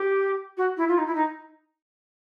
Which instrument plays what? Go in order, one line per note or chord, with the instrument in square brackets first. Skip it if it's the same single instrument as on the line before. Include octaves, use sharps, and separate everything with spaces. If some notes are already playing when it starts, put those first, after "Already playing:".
Already playing: [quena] G4
F#4
E4
F4
D#4
E4
D#4